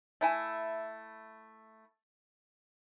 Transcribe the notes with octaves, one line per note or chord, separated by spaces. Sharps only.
A3 E4 G#5